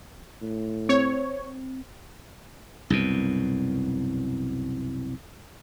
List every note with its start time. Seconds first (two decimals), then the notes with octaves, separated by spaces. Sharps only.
0.41 A2
0.89 C4 C#5
2.90 C2 F#2 B2